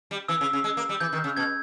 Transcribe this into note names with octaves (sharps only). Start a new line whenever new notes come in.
G3
E3 E6
C#3
C#3
G#3
A#3
G3
E3 G6
D#3
C#3
B2 G#6